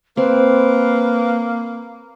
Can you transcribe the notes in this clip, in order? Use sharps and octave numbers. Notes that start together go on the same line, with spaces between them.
A#3 C4 B4